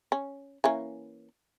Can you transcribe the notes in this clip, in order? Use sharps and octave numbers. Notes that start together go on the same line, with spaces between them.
C#4
E3 A#3 C#4